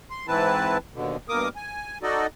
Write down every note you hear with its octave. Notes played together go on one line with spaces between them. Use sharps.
C6
G#2 E3 C4 E4 B4 A5
D#2 B2 D3
G2 B2 A#3 A#4 D6 D#6
G#5
D#4 F#4 A4 D5 D#5